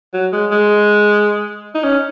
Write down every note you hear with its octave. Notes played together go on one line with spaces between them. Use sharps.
F#3
G#3
G#3
D#4
C#4